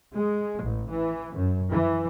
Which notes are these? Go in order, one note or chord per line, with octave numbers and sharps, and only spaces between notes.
G#3
A1
E3
F#2
E3